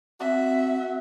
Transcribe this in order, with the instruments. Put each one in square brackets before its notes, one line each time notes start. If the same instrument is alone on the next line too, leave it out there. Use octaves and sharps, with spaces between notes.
[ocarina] C4 [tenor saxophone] F#4 [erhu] E5